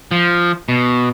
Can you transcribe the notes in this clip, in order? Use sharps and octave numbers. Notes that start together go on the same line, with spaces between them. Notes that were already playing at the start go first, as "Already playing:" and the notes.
F3
B2